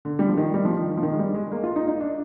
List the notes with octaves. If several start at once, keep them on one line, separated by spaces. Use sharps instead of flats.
D3
G3
F3
D#3
G3
F3
D#3
D#3
F3
D#3
G#3
G3
G#3
A#3
F4
D#4
D#4
D4